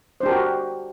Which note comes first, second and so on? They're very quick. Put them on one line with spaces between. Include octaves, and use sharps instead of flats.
C5 D4 G4 A#4 F#4